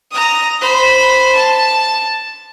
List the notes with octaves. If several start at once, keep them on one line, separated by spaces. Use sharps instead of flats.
A#5 D#6
C5 B5
A5